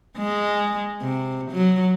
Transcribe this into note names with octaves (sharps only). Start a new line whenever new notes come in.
G#3
C3
F#3